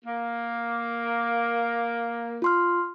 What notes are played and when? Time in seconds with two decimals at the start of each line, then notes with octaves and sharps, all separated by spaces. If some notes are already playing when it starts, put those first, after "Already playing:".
0.05 A#3
2.42 F4 C6 F6